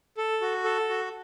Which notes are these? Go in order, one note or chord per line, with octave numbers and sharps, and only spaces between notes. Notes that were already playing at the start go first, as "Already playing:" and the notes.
A4
F#4
A4
F#4